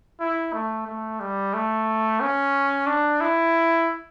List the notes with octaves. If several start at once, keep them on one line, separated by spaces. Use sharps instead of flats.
E4
A3
A3
G3
A3
C#4
D4
E4